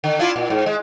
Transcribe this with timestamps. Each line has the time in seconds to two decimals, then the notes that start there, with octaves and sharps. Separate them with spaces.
0.04 D3
0.19 D4 E4 F4
0.36 A#2
0.50 G#2
0.66 G#3